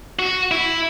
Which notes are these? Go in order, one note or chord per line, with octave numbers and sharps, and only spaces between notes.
F#4
E4